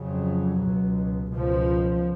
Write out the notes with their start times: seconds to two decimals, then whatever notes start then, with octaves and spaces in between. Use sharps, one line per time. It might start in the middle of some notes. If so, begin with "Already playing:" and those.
Already playing: F2 C#3 F#3
0.61 C#2 B2
1.33 C#2 B2 F3